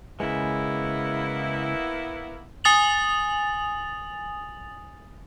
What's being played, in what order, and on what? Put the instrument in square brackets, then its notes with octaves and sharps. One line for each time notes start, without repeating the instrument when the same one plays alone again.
[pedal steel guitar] C#3 G#3 [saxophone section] A#3 B3 E4
[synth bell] G#5 D#6 A6 F7 F#7